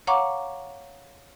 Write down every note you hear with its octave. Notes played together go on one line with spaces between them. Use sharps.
C#5 F5 F#5 A#5 C#6 D6